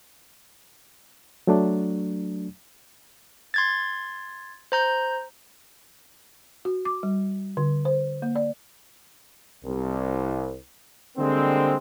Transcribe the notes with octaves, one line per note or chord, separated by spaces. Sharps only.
F#3 A3 D4
C6 G#6 A6
C5 A#5 G6
F#4
D6
G3
D3
C5
A#3
D5
C2
D3 G3 G#3 A#3 C4